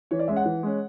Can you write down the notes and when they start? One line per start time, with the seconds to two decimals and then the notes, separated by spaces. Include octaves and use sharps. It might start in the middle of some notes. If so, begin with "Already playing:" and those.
0.11 E3 C#5
0.19 D5
0.28 G#3 C#4 E5
0.37 F#5
0.45 E3
0.63 G#3 C#4